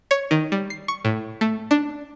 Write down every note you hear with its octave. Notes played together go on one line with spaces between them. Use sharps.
C#5
D#3
G3
C7
C#6
A2
A3
D4